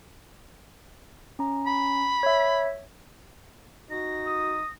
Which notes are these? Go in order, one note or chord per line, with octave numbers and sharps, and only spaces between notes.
C#4 A#5
B5
C#5 E5
D#4 F#4 A#6
D#6